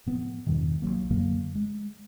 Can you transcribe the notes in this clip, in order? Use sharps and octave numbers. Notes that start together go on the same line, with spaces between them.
A2 F3 B3
E2 G2 B2 D#3
B1 F#2 F#3 A#3
F#2 D3 F#3 A#3
G#3